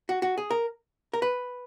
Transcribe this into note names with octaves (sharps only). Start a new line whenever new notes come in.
F#4
F#4
G#4
A#4
A#4
B4